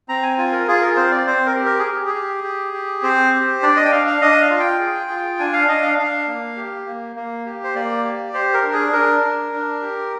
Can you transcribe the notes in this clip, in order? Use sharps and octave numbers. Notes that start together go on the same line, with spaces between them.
C4 A#5
G#5
F4 G#5
A#4
F4 G#4
A#4
C4 C5
D5
C4 C5
A#4
G4
A#4
G#4
G4
G#4
G4
G4
G4
C4 C5
G4
D4 D5
D#5
G5
D4 F5
F5
D4 D#5
F5
F4
G5
G#4
F4
D4 G#5
F5
D4 D#5
F5
D4 F5
A#3
G4
A#3
A#3
G4
C5
A#3 D5
G4
G4 C5
A#4
D4
G#4
D4 A#4
D4
D4
G4